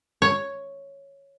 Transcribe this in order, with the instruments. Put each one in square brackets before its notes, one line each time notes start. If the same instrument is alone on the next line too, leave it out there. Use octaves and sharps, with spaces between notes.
[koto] C#5